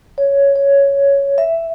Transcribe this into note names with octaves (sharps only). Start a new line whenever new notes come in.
C#5
C#5
E5